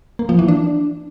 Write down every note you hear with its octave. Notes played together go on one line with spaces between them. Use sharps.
A#3
F3
E3
D4